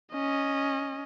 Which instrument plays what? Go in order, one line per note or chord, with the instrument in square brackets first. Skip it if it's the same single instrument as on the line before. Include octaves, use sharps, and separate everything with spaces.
[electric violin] C#4 D#5